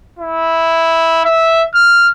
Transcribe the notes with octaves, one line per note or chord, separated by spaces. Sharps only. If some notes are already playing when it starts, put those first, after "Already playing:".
E4
E5
F6